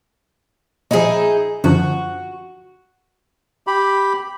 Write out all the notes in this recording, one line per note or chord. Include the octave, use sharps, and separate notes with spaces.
A#2 F3 D#4 E4 G#4
F#2 D3 F3 F#4
G4 B5